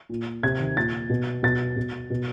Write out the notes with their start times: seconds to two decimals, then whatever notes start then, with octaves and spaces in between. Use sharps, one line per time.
0.09 A#2
0.43 C3 G#6
0.60 D#3
0.77 A#2 A6
1.10 B2
1.43 B2 A6
1.76 B2
2.10 B2